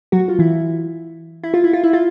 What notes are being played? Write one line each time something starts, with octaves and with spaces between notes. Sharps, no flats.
F#3 F#4
F4
E3 E4
E4
F4
E4
F4
E4
F4